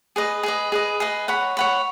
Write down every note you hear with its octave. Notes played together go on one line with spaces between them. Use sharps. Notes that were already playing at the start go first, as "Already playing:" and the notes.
G#4 B4 D#5
G#4 B4 D#5
G#4 B4 D#5
G#4 B4 D#5
C#5 F#5 B5
C#5 F#5 B5